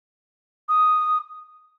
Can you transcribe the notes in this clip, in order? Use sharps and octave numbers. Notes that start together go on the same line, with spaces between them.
D#6